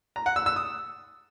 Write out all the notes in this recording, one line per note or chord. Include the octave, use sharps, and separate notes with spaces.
A#5
F#5
E6
E6
D#6